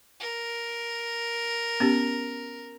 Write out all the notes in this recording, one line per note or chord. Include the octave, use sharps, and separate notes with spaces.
A#4
B3 C#4 G4